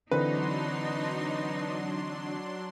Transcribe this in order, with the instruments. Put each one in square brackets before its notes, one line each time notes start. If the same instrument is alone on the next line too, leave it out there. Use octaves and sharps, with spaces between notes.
[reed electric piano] D3 E3 C4 [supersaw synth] F#3 D4 C6 [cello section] D#4 [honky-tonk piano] B4